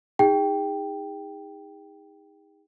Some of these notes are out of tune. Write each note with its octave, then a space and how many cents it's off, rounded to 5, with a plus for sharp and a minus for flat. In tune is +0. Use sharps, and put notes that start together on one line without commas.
D#4 +25 G#4 -40 G5 +0